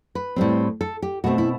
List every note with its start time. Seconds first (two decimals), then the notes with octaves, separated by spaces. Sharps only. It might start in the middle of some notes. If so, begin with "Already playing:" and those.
0.15 B4
0.36 A2 G3 C4
0.81 A4
1.02 G4
1.24 B2 A3 C4 F#4
1.38 E4